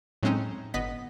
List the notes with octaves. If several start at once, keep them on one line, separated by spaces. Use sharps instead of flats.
A2 F#3 G#3 C4 C#4 D#4
G1 B3 D#5 B6